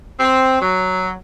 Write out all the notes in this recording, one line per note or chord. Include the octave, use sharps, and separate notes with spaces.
C4
F#3